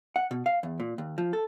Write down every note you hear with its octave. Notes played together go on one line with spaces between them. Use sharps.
F#5
B2
F5
E2
A#2
D#2
F3
A4